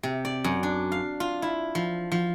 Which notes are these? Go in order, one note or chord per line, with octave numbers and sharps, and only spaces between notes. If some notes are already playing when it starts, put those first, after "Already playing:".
C3
D5
F#2
D4
F5
F4
E4
F3
F3